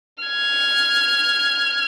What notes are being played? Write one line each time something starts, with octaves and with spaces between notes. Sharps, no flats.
F6 G#6